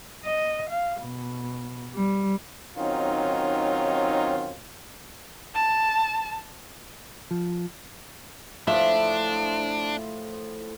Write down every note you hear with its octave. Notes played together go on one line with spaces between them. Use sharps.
D#5
F5
B2
G3
D#3 F#3 C4 C#4 D#4 F4
A5
F3
A2 F3 D4 E5 C6